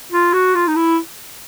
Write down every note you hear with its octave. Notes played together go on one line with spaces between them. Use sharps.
F4
F#4
F4
D#4
E4